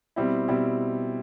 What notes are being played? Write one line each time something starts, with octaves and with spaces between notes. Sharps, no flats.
B2 G3 C4 E4
B2 G3 C4 E4